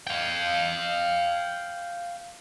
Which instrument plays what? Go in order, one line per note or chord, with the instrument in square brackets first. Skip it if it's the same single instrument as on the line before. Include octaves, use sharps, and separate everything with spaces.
[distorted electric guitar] F5 G5